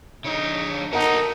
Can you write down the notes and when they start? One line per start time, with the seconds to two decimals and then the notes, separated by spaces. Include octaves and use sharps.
0.25 D3 D#4 C#5
0.93 D#4 F#4 A4 A#4 F#5 A#5